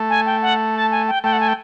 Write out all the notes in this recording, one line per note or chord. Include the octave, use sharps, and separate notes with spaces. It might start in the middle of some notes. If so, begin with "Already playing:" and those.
Already playing: A3
G#5
G5
F#5
A5
G#5
G5
A3 G5
F#5
G#5
G5